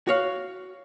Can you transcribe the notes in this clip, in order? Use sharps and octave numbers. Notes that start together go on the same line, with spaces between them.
F#4 C#5 F5